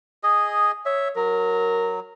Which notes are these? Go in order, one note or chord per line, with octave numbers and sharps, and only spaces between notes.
G#4 D#5
C#5 E5
F#3 A#4